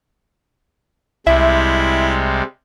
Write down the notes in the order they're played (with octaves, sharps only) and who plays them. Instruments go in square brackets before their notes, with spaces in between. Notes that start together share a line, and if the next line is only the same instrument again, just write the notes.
[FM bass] C2 [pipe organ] C3 G3 G#3 [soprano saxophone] E4 [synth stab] E5